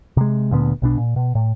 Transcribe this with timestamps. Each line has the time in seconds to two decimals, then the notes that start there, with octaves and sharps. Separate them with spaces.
0.17 C3 G#3
0.51 D2 A#2 D3 B3
0.82 B1 B2 D4
0.98 A#2
1.16 B2
1.35 A2